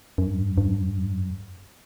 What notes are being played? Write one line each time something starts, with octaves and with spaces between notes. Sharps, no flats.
F#2
G2
F#2
G2
F#2
G2
F#2
G2
F#2
G2
F#2
G2
F#2